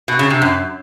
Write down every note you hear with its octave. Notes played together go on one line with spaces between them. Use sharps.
B2
C#3
C3
F#2